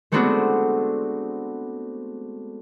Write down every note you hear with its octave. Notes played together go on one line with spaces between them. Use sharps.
G#3 A3 B3 C4 D4 F#4